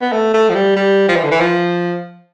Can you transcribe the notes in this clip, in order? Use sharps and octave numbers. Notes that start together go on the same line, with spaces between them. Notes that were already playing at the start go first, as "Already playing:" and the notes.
B3
A3
A3
F3
G3
G3
F3
E3
D3
E3
F3